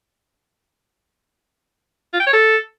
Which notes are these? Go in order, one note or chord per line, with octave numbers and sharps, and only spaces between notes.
F4
G5
C#5
A4